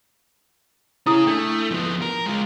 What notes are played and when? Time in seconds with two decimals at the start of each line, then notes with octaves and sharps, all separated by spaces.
1.06 C#4 E4 G#4 D#6
1.27 A3 D4
1.71 F3 B3
2.02 A#4
2.26 G#3 F4